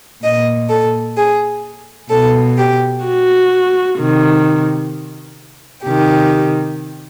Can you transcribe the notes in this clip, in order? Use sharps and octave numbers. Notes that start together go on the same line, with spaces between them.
A#2 D#5
A4
G#4
B2 A4
G4
F#4
C3 D#3
C3 D#3 G4